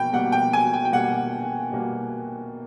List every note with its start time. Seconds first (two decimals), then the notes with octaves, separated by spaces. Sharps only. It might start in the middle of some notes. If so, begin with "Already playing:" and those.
Already playing: B2 A#3 G5 B5
0.13 B2 G3 A#3 F#5
0.32 G5
0.53 G#5
0.73 G5
0.85 G5
0.92 B2 G3 A#3 F#5
1.72 B2 G3 A#3